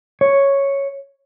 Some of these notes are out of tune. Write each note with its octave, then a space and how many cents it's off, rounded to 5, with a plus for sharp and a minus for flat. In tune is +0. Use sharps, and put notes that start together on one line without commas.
C#5 +0